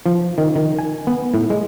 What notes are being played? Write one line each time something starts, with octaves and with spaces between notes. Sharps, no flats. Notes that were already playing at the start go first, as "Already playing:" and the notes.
F3
D#3
D#3
G#5
B3
A2
G#3